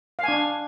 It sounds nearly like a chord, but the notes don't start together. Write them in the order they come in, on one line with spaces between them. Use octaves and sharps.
F5 G#5 D4